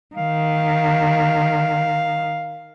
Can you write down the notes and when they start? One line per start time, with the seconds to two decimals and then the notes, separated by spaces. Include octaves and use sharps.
0.16 D#3 F5